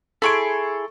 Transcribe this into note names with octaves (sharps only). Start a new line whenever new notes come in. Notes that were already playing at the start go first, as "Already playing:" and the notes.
E4 G#4 A4 C6 C#6 D7